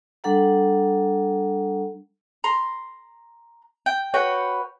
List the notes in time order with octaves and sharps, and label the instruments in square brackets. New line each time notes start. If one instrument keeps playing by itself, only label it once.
[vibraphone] G3 D4 A4 F#5 A#5
[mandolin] A#5 C6
G5
F#4 B4 C#5 G5